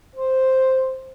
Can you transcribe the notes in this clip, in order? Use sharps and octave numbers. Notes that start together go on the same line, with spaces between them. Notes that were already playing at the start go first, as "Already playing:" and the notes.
C5